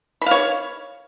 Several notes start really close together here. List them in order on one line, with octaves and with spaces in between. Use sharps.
B5 F5 C#5